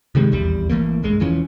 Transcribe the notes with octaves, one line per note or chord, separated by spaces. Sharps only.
C3 D#3 G3 G#3
D#1 A#1 E2 G3
G#1 E3 A3 A#3
B1 G2 G#3
E1 E3 F3 C#4